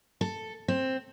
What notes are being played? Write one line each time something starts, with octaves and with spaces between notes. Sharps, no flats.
A4
C4